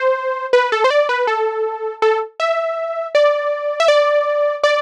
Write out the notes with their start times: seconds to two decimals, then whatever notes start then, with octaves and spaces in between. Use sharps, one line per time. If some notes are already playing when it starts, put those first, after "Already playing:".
Already playing: C5
0.53 B4
0.72 A4
0.84 C5
0.90 D5
1.09 B4
1.27 A4
2.02 A4
2.40 E5
3.15 D5
3.80 E5
3.88 D5
4.64 D5